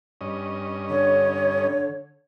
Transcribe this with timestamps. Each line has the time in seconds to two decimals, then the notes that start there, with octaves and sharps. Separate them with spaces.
0.21 G2 C#4 D#5
0.90 D3 C#5